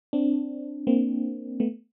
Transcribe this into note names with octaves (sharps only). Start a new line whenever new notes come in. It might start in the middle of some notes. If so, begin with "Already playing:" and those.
C4 D4
A#3 C4
A3 B3